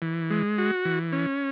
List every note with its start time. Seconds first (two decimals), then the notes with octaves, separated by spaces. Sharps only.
0.02 E3
0.30 G#3
0.58 F#4
0.85 E3
1.13 C#4